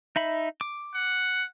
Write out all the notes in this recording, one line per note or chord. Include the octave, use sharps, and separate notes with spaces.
D#4 E5 B5
D6
F#5